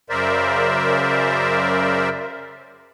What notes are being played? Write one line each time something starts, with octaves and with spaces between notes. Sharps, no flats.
F#2 C#3 A#4 C5 D5 E5